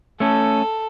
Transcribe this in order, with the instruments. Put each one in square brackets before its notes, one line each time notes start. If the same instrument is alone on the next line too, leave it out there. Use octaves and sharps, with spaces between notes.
[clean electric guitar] A3 C#4 [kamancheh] A4